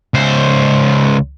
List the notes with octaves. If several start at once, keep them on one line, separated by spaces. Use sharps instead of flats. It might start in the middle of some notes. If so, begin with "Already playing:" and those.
C#2 C5